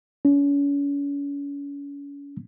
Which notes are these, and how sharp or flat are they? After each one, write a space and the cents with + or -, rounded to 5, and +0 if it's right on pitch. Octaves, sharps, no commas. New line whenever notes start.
C#4 +35